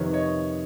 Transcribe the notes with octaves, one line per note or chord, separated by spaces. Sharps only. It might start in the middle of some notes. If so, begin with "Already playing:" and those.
Already playing: F2 C3 D#3 B4 C#5
C#5 D#5